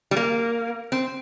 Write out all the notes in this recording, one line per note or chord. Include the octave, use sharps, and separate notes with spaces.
G3
A#3
C4